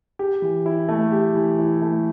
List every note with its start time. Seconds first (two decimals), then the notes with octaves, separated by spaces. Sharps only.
0.19 G4
0.42 E3
0.66 E4
0.89 A3
1.12 G4
1.35 E3
1.59 E4
1.82 A3